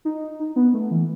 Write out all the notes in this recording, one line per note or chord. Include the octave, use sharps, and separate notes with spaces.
D#4
D#4
B3
A3
E3